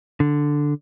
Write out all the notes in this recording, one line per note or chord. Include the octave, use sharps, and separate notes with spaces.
D3